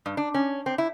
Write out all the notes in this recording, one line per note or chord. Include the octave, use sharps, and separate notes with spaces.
G2
D4
C#4
C4
E4